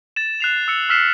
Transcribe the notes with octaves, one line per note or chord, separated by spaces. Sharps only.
A6 E7
F#6 C7 F7
E6 C#7
E6 F6 B6 C7 E7